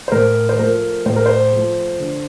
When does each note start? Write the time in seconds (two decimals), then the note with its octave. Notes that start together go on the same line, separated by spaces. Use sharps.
0.08 C5
0.12 A2 A#4
0.49 C5
0.59 F3 A3 A#4
1.06 A2 C5
1.16 A#4
1.26 C5
1.53 F3 A3
2.00 D3